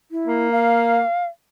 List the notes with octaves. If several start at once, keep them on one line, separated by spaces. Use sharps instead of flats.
E4
A#3
F5